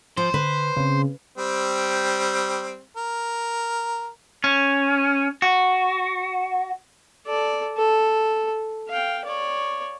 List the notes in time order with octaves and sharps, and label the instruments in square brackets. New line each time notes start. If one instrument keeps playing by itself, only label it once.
[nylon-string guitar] F3 [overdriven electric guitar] C5
[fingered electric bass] D3 [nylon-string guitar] B4
[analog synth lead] C#3 [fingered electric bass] C4 D4
[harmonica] G3 C4
A#4
[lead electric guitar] C#4
F#4
[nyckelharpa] A4 D5
A4
F5 G5
C#5 D5